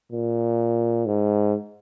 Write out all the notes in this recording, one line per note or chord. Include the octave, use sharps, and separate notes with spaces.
A#2
G#2